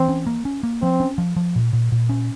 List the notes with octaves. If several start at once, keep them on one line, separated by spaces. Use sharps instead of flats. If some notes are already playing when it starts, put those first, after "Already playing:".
Already playing: E3 C4
C#4
A#3
C#4
A#3
F3 C4
C#4
F3
F3
A#2
A#2
A#2
C#4